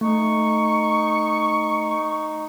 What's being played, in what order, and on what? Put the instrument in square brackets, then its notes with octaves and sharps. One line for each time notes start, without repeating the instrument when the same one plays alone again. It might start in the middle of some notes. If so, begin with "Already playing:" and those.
[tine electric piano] A3 [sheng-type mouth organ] D#4 [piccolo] C#6